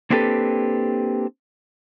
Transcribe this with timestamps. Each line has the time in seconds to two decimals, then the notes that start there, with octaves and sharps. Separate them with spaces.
0.10 A#3 C4 D4 G4 A4 B4